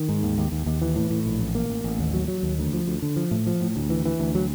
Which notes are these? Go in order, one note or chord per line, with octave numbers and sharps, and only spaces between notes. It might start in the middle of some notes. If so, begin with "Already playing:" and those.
Already playing: D#3
G#2
D#2
D#2
D#2
D#2
E3
A2
A2
A#1
A1
A#3
A1
A1
D#2
F#3
F#3
D#2
D2
F3
D2
D3
F3
A2
F3
A2
D2
E3
E3
D2
F#3